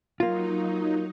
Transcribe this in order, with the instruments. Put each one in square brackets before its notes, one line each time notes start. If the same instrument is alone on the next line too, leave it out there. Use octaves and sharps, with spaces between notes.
[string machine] F#3 D#4 [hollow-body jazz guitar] A#3 F4